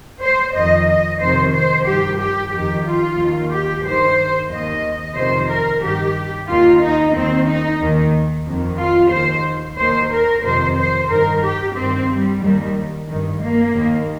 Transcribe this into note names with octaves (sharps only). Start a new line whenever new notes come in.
C5
F2 D#3 D#5
D#5
F2 C3 D#3 C5
C5
G2 D#3 G4
G4
F2 D#3 G4
F4
D#2 D#3
G4
G2 D#3 C5
D#2 D#3 D#5
F2 C3 D#3 C5
A#4
G2 D#3 G4
D#2 D#3 F4
D#4
D#2 D#3 C4
D#4
D#2 D#3
F2 D#3
F4
D#2 D#3 C5
D#2 D#3 C5
A#4
F2 C3 D#3 C5
C5
G2 D#3 A#4
G4
G2 D#3 C4
G3
D#2 D#3 G3
G2 D#3
A#3
D#2 D#3